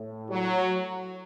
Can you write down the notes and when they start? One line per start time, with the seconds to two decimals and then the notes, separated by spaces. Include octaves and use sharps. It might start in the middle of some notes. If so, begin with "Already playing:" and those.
Already playing: A2
0.30 F#3